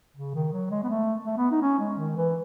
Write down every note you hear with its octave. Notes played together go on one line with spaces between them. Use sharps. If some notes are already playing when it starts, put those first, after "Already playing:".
C#3
D#3
F#3
G#3
B3
A3
A3
B3
D#4
C#4
G#3
D#3
E3